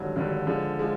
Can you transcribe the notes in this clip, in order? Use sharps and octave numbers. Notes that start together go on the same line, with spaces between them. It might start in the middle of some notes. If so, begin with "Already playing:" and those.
Already playing: G#1 G2 D3 F#3
G#1 G2 D3 F#3
D3 F3 G#3
F3 G#3